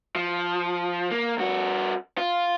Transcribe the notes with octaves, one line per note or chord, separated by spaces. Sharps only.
F3
A#3
G2 F#4
F4